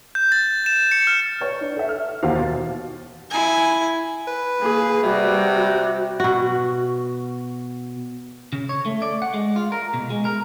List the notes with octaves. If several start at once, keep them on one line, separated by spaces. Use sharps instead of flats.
G6
A6
E7
C#7
F6
B4 C#5
D4
A4 E5
F6
D#2 E3 F#4 C5 F5
B2 A6
E4 G#5
B4
A#3 G#4
C3 G3 F#4
B2 F#4
C#3
C#5
A3
D5
F#5
G#3
F4
A#4
B2
G#3
A#4